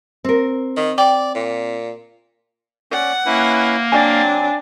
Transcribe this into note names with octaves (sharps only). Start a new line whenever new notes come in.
C4 A#4
D#3
D5 G5
A#2
C#4 D5 F#5
A#3 C#4 E4 B4
F#3 C4 D4 D5 G5 G#5